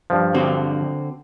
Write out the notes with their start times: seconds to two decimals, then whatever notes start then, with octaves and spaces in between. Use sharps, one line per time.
0.10 G2 F3
0.34 D3 C4 F#4